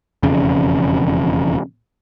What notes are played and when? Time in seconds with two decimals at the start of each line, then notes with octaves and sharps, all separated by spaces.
0.23 E1 F2 C#3